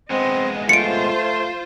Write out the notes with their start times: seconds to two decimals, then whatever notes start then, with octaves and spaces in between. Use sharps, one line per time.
0.10 G#3 B3 C4 D#5
0.69 A3 F4 C5 C#7 D7